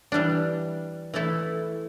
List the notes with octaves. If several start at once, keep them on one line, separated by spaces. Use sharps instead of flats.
E3 G3 D4
E3 A3 E4 A4